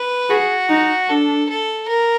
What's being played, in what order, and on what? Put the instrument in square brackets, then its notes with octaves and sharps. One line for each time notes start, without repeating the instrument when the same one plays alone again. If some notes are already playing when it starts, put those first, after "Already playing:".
Already playing: [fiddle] B4
[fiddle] F#4 [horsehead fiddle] G#4
[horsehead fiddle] D#4
[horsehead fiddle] D4 [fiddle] A4
[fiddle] A4
A#4